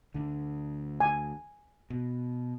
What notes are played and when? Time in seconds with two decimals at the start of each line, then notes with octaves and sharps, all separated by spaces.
0.14 D2 D3
1.00 G#5
1.90 B2